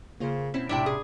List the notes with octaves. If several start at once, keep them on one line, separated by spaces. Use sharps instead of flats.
C#3 A#3 F4 C5
B2 C4 C#4 E4
A#1 A2 C3 D4 E4 G5
G#4